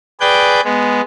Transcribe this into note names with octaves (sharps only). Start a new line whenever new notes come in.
G#4 B4 D5 G5 G6
G#3 B3